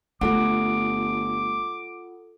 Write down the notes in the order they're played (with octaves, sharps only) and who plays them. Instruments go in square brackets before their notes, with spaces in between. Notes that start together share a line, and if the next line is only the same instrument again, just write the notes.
[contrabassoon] G1 [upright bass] A3 [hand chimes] F4 A4 F#5 [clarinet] D6